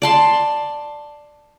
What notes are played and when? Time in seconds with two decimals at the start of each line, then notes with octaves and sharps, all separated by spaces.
0.02 D5 A5 C6